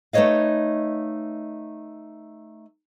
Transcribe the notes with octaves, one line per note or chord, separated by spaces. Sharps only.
A3 D#4 B4 C#5 D#5 F5